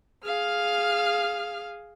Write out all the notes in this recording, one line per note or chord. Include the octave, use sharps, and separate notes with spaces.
G#4 F5 F6